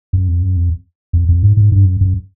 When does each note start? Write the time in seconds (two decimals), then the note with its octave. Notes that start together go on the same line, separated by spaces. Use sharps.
0.13 F#2
0.28 F2
0.42 F#2
0.57 F2
1.13 F2
1.29 F2
1.43 G#2
1.57 G#2
1.72 G2
1.85 F#2
2.01 F#2